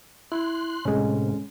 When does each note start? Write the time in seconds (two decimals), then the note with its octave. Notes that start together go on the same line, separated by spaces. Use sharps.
0.32 E4 C6 F#6
0.85 A2 C3 G#3 C#4